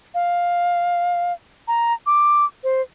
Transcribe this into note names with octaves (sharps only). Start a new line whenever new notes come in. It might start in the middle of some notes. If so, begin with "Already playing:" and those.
F5
A#5
D6
C5